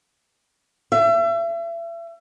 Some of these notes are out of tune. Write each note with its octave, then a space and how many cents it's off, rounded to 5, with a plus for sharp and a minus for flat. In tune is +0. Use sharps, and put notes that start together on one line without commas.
E5 +35